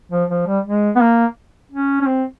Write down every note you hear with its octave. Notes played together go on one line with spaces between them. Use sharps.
F3
F3
G3
G#3
B3
A#3
C#4
C#4
C4